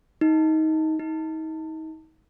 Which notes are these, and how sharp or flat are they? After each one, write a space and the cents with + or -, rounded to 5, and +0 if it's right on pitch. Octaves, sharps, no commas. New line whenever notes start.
D#4 +20
D#4 +35